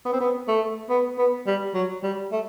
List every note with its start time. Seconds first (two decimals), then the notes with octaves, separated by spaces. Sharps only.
0.05 B3
0.13 C4
0.21 B3
0.48 A3
0.90 B3
1.18 B3
1.47 G3
1.74 F#3
2.03 G3
2.32 A3